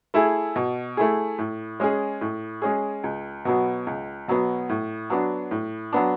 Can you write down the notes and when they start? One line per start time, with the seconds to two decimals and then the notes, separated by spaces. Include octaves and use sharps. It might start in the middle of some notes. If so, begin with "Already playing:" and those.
0.14 A3 E4 G#4
0.56 B2
0.97 A3 E4 G#4
1.38 A2
1.80 G#3 C#4 G#4
2.21 A2
2.62 G#3 C#4 G#4
3.04 C#2
3.45 B2 F#3 B3
3.87 C#2
4.28 B2 F#3 B3
4.69 A2
5.10 F#3 B3 D4
5.51 A2
5.93 F#3 B3 D4